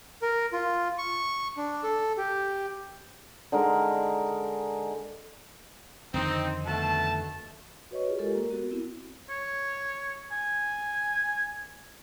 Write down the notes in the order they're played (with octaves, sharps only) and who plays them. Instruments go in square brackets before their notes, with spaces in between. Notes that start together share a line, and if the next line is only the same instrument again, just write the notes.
[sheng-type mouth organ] A#4
F4
C#6
D4
A4
G4
[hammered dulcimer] D3 G#3 D#4 A#4
[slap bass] F2 D3 D#3 [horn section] C4 D#4
[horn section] B2 A3 A5
[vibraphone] F#4 B4 C#5 D#5 C#6
F4 G4 G#4 D5
G#3 F4 G4 A4 A#4
A#3 A#4
B3 F#4
B3 C4 E4
[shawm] C#5
G#5